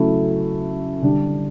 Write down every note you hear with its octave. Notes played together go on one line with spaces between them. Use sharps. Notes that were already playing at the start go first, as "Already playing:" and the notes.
Already playing: C#3 F#3 A3 E4
D3 G3 D4